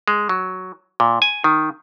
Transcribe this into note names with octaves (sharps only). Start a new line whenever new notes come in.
G#3
F#3
A#2
G#5
D#3